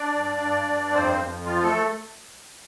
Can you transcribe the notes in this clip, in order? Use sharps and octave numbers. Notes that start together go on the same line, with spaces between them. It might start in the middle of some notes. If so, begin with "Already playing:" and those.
Already playing: D4 D5
G2
G2
G2
F2 C4 C5
F2
F3 F4
A3 A4